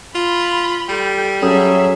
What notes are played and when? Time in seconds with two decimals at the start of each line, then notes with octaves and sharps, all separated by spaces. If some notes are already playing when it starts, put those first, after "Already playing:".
0.15 F4 B5
0.89 G3 A4 G5
1.43 F#3 C#4 G#4 A4 E5 D#6